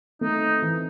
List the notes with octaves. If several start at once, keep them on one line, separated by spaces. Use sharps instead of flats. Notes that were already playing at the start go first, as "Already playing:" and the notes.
A3 D#4
C4
E3